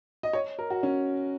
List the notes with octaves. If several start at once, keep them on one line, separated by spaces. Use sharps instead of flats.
D#5
C#5
A#4
F#4
C#4